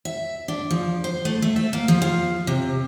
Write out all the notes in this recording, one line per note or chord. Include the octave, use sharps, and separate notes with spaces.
E5
D4
F3
C5
A3
A3
E5
A#3
F3
F4
C3